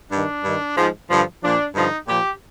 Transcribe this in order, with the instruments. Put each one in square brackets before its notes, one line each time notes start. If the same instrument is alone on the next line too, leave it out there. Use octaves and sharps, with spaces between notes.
[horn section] G2 D#3 D4
G2 D#3
G#2 F3
G2 D3 F3
A#2 F3 D4
G2 D3 F3 D#4
A#2 F3 G4